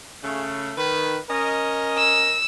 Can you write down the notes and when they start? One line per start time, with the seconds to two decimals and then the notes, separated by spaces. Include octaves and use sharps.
0.24 C#3 A3
0.78 D#3 B4
1.30 C#4 A#4 D#5
1.98 E6